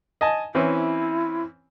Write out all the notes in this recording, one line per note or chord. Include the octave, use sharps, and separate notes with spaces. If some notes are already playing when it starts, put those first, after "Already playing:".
D#5 G#5 A5
E3 C4 C#4 E4